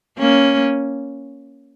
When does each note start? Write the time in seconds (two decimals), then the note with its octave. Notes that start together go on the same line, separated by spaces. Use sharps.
0.18 A#3 C#4